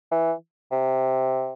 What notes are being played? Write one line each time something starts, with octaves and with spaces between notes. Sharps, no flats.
E3
C3